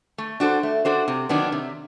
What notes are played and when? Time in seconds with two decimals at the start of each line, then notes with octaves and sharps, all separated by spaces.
0.18 A3
0.40 D4 F#4 A4 C5
0.63 A3
0.85 D4 F#4 A4 C5
1.08 C3
1.29 D#3 F#3 B3 D4
1.52 C3